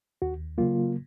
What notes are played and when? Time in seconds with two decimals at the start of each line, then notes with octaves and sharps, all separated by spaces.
0.22 D#2 F#4
0.58 C#3 F#3 A#3 F4